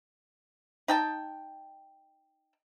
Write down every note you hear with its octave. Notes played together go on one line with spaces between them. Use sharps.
D#4 G5 A5